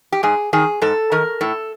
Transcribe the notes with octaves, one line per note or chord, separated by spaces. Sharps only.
G4
G#2 G#4
D#3 G#4
G#2 A4
D#3 A#4
A2 A4